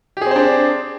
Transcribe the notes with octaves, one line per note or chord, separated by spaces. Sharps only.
C4 D4 G4 G#4 C5